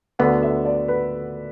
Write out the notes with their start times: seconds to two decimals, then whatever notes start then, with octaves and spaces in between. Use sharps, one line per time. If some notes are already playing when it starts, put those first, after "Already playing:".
0.19 D2 D3 B3 F#5
0.43 E5
0.65 D5
0.88 B4